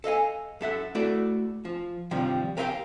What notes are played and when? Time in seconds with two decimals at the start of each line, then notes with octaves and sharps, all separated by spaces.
0.04 A4 D#5 F5 G#5
0.61 F#2 A4 E5 F#5
0.95 A3 E4 F#4 A4 D5
1.65 F3
2.11 G2 C3 D#3 F3 G3
2.57 G4 A#4 B4 E5 F5 G5